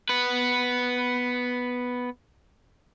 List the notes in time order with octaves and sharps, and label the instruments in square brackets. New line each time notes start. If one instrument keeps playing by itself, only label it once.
[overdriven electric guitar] B3 B4